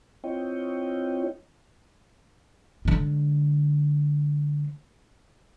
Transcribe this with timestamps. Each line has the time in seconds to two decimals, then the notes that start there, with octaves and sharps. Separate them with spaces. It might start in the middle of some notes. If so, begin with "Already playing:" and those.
0.24 C4 E4 F4 C#5 D#5 G5
2.85 D3 G#3